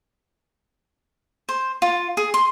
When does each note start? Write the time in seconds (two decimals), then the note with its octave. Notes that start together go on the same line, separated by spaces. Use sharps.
1.49 C5
1.82 F4
2.17 G#4
2.34 C6